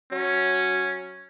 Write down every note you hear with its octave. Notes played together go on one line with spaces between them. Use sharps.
F#3 C#4